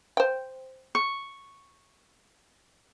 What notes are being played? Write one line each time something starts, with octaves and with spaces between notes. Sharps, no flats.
C5 G5
C#6